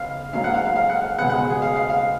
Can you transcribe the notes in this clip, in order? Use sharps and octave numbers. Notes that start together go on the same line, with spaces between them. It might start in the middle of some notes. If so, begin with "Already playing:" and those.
Already playing: C#2 B3 F5
G#2 F#3 A#3 F5
F#5
F5
F5
F5
F#5
C#2 B2 G#3 B3 F#5
F#5
G#4
F5
F5
F5